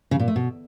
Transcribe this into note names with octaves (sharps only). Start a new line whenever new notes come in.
C#3
A#2
A3
B2